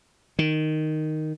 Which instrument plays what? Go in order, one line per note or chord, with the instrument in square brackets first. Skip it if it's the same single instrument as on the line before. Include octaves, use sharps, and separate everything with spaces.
[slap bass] D#3